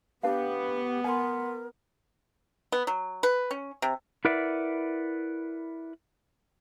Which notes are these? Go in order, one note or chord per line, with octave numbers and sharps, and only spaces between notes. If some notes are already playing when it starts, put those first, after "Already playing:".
B3 D4 G4 B4 F5
A#4 F#5 G#5 C6
B3
F#3
B4
C#4
C3
E4 A#4 B4 D5 E5 F#5